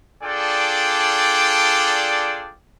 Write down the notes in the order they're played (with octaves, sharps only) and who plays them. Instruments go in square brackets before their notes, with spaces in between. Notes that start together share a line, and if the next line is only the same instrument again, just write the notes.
[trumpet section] D4 F4 G#4 A4 D5 G5